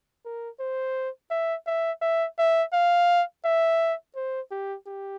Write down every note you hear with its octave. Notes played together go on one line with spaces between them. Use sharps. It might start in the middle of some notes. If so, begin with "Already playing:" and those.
A#4
C5
E5
E5
E5
E5
F5
E5
C5
G4
G4